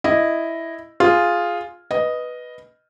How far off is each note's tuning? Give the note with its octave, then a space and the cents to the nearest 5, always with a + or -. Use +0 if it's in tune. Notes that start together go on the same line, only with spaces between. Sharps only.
E4 +0 D#5 -5
F4 +0 G#4 +0
B4 +0 D#5 +0